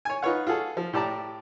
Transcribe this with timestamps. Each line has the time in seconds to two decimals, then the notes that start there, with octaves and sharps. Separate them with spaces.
0.05 C#5 G#5
0.22 D#4 F4 B4 C#5 F#5
0.47 F4 F#4 G#4 A4
0.77 F3
0.93 A2 G4 D5 A5 A#5